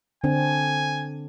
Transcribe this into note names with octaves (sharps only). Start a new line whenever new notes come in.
D3 C4 D4 G#5